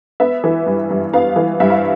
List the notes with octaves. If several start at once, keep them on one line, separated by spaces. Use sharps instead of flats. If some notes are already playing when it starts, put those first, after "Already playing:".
B3 E5
E3
G2
G2
B3 F5
E3
G2 E5
F5